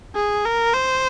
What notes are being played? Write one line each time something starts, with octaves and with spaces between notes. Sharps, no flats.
G#4
A#4
C5